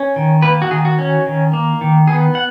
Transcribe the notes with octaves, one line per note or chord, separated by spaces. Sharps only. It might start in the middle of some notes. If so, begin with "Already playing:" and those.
Already playing: C#4
D#3
A#3 B4
F#4
D#3 G#4
F#4
C#4
D#3
A#3
D#3
B3 G#4
F#5